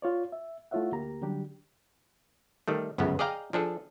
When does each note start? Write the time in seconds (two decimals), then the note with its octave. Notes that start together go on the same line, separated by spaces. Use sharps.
0.02 F4 C#5 D5
0.32 E5
0.71 A3 E4 F4 C#5 E5 F#5
0.92 D2 A#3 G4 A#5
1.22 D3 F#3 G3 D4 G4
2.68 D#3 G3 A3
2.98 G1 C#2 F#2 C#3 B3
3.19 G#4 D5 D#5 F5 G5 A#5
3.53 F3 D4 G#4 A4